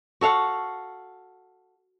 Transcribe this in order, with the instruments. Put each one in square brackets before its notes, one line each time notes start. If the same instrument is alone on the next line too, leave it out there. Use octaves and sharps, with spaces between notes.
[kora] F#4 A4 F5 F#5